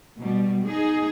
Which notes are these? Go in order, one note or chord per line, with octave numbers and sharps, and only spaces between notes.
B2 G3
D#4 G#4